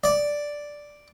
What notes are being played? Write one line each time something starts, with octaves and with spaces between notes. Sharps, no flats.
D5